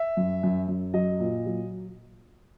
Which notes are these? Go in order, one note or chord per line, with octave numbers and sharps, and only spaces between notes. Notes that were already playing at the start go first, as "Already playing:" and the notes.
Already playing: E5
F#2
F#2
F#2
F#3 D#5
A#2
F#3